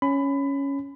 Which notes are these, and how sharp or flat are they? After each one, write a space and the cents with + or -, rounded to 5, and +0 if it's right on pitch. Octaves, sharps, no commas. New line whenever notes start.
C#4 +0 B5 +20